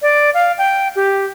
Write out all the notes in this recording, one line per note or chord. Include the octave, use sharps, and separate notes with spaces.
D5
F5
G5
G4